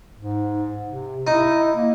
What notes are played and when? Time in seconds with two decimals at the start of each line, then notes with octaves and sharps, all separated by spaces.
0.17 G#2
0.88 C3
1.27 D#4 E4
1.76 A#3